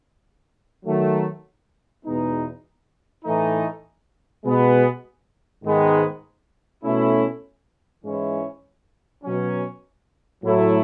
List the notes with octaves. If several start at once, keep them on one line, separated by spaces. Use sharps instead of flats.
D#3 F#3 A3
E2 B2 G#3 B3 D#4
A2 E3 A3 D#4
B2 G#3 B3
G#2 D#3 G#3 B3
B2 A3 C#4 E4
G#2 E3 G#3 C#4 E4
B2 F#3 C#4
A2 F#3 A3 E4